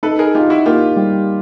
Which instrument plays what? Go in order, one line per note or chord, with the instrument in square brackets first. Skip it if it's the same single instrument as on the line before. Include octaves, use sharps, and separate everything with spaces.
[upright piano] D#4 [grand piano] A4 B4
[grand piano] G#4 A#4
[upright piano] D#4 [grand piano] F4 G4
[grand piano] E4 F#4
[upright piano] A#3 [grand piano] F4 G4
[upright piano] G3